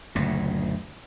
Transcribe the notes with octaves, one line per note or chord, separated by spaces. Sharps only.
F#1 D2 A#2 C#3